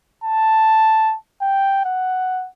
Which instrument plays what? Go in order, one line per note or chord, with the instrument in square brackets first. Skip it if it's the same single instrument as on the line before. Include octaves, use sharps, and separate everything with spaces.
[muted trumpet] A5
G5
F#5